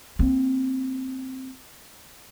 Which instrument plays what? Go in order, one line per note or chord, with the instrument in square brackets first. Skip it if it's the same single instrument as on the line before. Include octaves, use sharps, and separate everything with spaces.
[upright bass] A#3 C4